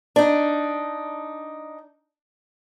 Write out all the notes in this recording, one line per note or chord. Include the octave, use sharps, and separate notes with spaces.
D4 D#4